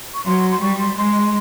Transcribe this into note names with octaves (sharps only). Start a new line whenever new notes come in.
C#6
F#3 C6
C6
G3 C#6
C6
G#3 C6